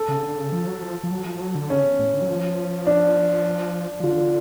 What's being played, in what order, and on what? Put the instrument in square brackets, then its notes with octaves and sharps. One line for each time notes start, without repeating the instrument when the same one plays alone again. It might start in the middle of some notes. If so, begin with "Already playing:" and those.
Already playing: [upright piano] A4
[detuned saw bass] C#3
D3
C#3
F3
F#3
F3
F3
F#3
F3
F#3
D3
[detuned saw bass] C#3 [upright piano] C#4
[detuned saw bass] A2
D3
F#3
F3
[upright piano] D4
[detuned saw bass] F3
[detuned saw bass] D3 [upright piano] F4